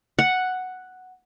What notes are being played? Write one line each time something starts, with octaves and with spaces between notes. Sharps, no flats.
F#5